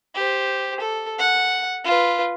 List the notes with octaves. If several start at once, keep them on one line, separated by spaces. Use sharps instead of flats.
G4 C5
A4
F#5
F4 B4